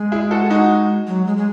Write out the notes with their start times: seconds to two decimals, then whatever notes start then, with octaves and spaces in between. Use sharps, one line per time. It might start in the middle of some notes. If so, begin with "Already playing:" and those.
Already playing: G#3
0.12 E4 G#4
0.31 F#4 A4
0.50 D#4 F#4
1.07 F#3
1.27 G#3
1.37 G#3